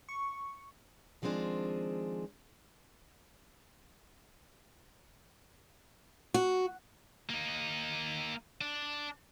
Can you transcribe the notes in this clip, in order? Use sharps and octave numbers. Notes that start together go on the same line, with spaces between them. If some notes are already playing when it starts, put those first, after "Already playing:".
C#6
D#3 F3 G#3 C4 D4 G#4
F#4
A#3 D#4
D4